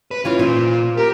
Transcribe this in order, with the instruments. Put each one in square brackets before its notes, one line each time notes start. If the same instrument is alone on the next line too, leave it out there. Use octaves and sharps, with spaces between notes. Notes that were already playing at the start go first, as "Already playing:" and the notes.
[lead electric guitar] B4
[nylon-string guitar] E3 C#4 E4 [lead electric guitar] F4
[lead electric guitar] A#2 [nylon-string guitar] F4 C5 E5
[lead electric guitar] G4 [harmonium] A#4